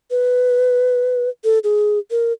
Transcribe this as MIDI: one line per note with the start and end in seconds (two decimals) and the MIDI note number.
0.11 1.29 71
1.44 1.59 69
1.64 1.99 68
2.11 2.33 70